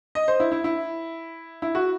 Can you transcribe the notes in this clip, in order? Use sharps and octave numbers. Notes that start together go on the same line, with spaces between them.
D#5
C5
E4
E4
E4
E4
F#4